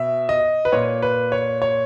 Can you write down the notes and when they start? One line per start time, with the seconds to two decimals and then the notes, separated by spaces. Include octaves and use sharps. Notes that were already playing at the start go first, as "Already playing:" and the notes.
Already playing: B2 E5
0.29 D#5
0.65 B4
0.72 A#2 C#5
1.02 B4
1.32 C#5
1.62 C#5